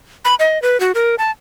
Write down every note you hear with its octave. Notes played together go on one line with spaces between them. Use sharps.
B5
D#5
B4
F#4
A#4
A5